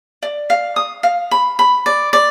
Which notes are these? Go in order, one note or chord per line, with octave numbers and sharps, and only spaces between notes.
D5
F5
D#6
F5
B5
B5
D5
D5